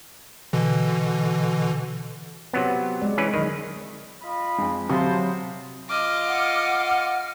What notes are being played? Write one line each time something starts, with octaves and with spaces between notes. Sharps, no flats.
B2 D3 E3
C3 F#3 B3 C4 F4
G#3 D5
E3 C#4 B4
D3 D#3 F#3
F4 D#5 B5
F2 G#3
C3 F#3 C5 F5 A5 B5 D#6
F4 D#5 D6 F6
F#5